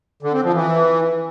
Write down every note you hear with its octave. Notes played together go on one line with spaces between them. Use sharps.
D3
C4
F3
E3